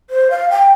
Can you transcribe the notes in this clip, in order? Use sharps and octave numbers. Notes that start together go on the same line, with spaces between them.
C5
F5
G5